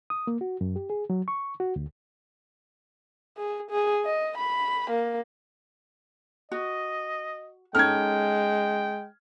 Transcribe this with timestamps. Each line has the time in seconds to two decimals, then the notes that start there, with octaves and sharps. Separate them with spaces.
0.10 D#6
0.27 A#3
0.41 F#4
0.61 F#2
0.76 G4
0.90 G#4
1.10 F#3
1.28 C#6
1.60 F#4
1.76 D2
3.37 G#4
3.71 G#4
4.05 D#5
4.38 B5
4.91 A#3
6.52 F#4 D#5
7.75 G#3 C#4 D#4 A4 G5 F6 G#6